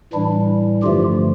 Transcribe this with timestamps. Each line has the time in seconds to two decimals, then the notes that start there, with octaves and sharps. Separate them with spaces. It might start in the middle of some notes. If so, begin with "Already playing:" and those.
0.13 A2 E3 G3 D4 E4
0.83 G2 D3 F3 A3 F4 G4